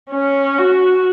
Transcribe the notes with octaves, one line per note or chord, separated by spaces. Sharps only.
C#4
F#4